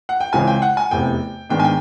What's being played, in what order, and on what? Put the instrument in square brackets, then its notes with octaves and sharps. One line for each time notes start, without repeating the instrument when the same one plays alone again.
[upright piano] F#5
G5
C#2 C#3 E3 G#3 C4 G#5
G5
F#5
G#5
F1 E2 C3 G5
G#2 D#3 G#3 B3 D4 G5
G#5
G5